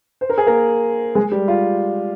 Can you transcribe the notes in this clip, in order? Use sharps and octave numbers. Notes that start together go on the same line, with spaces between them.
C5
A#4
G#4
A#3 A#4
G#3 G#4
G3 G4
F4